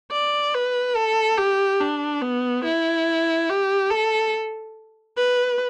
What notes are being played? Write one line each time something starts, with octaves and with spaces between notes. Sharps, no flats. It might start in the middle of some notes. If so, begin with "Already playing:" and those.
D5
B4
A4
G4
D4
B3
E4
G4
A4
B4